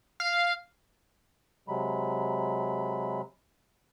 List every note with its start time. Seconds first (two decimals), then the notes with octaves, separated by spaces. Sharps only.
0.20 F5
1.68 C3 F#3 G#3 B5